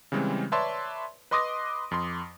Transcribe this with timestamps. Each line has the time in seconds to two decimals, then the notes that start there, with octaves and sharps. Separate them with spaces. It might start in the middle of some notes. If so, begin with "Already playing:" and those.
0.12 C#3 E3 G3 G#3 C4
0.52 B4 C#5 D5 E5 A5 C6
1.31 B4 D#5 C6 D6 D#6 A#6
1.91 F2 C6